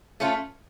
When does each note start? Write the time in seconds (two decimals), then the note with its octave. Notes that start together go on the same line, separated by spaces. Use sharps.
0.20 A3 C#4 F4